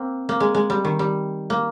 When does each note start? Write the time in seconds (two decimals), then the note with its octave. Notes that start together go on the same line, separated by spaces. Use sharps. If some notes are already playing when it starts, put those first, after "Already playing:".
Already playing: A#3 C4
0.29 A#3
0.40 G#3
0.55 G#3
0.70 G3
0.85 D#3
0.99 G3
1.50 A#3